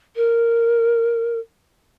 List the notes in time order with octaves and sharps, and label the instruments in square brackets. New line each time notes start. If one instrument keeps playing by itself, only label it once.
[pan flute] A#4